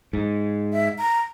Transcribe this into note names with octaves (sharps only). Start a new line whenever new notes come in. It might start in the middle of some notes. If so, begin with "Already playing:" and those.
G#2
E5
A#5